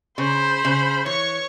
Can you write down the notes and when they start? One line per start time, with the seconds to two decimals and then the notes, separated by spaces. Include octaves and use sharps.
0.18 C#3 C5 B5
0.65 C#3
1.06 E3 C#5 C#6